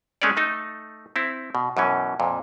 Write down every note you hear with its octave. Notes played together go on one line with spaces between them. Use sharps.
G#3 A3 C#4 G#4 C#5 D5
A3 D#4 A4
C4 E4
B2
F#2 B2 E3 C#4
F2 A#2